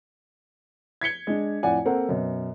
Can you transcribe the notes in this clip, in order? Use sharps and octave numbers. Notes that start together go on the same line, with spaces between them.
G#6 B6 C#7 G7
G#3 D4
F2 A2 D5 F#5 G#5
A#3 C4 A4 A#4 C5 F#5
F#2 B2